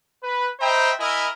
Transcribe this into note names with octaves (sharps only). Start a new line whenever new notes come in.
B4
C5 D#5 E5 G5 A#5 B5
E4 A#4 D#5 E5 G#5 B5